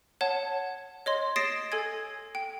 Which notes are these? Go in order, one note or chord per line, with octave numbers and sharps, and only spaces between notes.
C#5 F#5 A5
C#5 D#5 C6
D#6 A6 A#6 C7 D7 E7
A4 G#5 G#6
G5